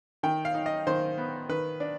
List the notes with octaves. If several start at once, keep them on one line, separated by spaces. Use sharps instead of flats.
D#3 G5
F5
D#4
D#5
D#3 C5
B3
D#3 B4
D4